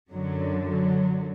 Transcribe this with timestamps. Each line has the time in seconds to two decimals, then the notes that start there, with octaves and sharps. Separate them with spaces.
0.12 F#2 D3 F#3
0.67 F#3